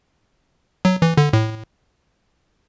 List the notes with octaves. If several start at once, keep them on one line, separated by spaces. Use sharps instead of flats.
F#3
E3
D3
A2